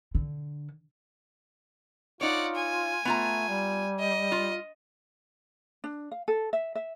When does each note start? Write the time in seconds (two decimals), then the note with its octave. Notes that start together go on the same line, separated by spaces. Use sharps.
0.15 D3
2.21 D#4 F4 C#5 D5 F#5
2.55 G#5
3.05 A3 B3 F4 A#5
3.48 G3
3.99 D#5
4.32 F4
5.84 D4
6.11 F5
6.28 A4
6.53 E5
6.75 E5